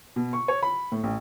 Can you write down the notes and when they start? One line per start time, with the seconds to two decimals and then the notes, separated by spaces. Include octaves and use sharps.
0.16 B2
0.33 C#6
0.48 C#5
0.63 B5
0.92 A2
1.03 A1